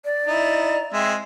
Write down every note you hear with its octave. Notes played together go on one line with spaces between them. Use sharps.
D5
D#4 E4
G#3 C4 E5